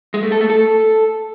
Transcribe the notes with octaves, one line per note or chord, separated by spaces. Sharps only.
G#3
A3
A4
A3
A4